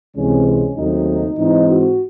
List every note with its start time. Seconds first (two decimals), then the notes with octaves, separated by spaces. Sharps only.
0.15 C#2 C3 E3 G#3 C4 C#4
0.46 C#4
0.76 D#2 C#3 F#3 A3 C4 D#4
1.38 G#2 E3 C4 D#4
1.68 F#4